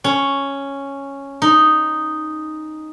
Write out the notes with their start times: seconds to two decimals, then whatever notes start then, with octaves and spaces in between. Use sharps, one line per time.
0.04 C#4
1.42 D#4